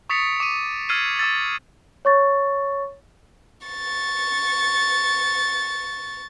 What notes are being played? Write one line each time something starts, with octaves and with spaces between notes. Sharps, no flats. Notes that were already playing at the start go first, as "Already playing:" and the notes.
C#6 D#6 A6 B6 C#7 F7
D6 D#7
E6 F6 G#6 A6 C7 D#7
D6 E6 A6
C#5 C#6 A6
C#6 A6